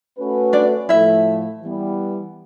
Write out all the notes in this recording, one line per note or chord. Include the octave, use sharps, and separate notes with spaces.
A3 C#4 F#4 B4
D4 D5
A2 F3 A3 E4 E5
E3 G3 B3